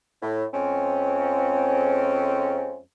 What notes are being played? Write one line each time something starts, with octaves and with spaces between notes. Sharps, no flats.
A2
F2 G#3 C4 C#4